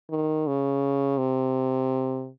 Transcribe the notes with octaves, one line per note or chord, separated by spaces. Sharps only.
D#3
C#3
C3